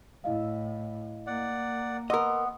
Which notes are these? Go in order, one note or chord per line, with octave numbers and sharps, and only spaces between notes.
A2 E4 D#5 F5
A#3 D5 F#5
B3 A#4 D#5 C6 D6 E6